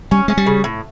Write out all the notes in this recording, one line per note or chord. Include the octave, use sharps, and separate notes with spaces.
G3 C#4
G#3 C#4
G3
C#3
A2